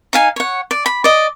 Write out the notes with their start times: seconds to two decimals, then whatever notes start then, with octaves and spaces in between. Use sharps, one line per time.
0.13 D#4 F5 G#5
0.36 C#5 F#5
0.71 D5
0.86 B5
1.04 D5 D#5